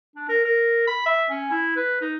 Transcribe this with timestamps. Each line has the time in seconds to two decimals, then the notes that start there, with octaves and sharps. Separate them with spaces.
0.16 D4
0.29 A#4
0.44 A#4
0.87 B5
1.06 E5
1.30 C#4
1.51 E4
1.76 B4
2.01 D#4